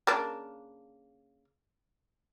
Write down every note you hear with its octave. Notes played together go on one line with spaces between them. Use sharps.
C#3 A#3 D4